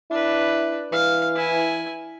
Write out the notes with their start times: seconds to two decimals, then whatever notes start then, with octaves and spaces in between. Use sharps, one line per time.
0.10 D4 E4 B4
0.92 E3 F5
1.35 E4 G#5